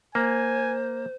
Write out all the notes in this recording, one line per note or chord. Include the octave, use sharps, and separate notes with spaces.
A#3 C5 G#5